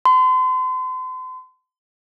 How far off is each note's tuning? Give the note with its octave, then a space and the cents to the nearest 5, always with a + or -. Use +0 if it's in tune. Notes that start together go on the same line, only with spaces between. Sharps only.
C6 -40